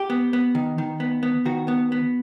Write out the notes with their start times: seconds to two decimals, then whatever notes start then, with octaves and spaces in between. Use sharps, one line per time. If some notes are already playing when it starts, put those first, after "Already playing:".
Already playing: G4
0.10 B3
0.33 B3
0.55 D#3
0.78 D#3
1.00 B3
1.23 B3
1.45 D#3 F#4
1.68 B3
1.92 B3